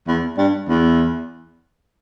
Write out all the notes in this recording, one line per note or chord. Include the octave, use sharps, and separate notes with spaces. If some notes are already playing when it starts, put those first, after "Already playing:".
E2
G2
E2